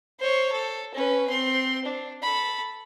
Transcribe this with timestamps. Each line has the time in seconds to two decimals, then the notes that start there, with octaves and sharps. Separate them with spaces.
0.19 C5 C#5
0.52 A4
0.94 C#4 B4
1.27 C4 C6
1.85 D4
2.22 A4 B5